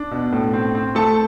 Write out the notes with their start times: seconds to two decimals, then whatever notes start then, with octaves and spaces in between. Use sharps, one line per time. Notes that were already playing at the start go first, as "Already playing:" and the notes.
Already playing: D4
0.11 B2
0.33 A2
0.53 C4
0.75 C4
0.95 A3 A4 A5